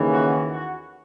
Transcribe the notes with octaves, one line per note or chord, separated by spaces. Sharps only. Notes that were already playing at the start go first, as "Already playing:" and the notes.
Already playing: D#2 C#3 E3
F#4
F#4